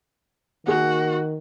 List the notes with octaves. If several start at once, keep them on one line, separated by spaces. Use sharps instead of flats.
D#3 A#3 F#4 G#4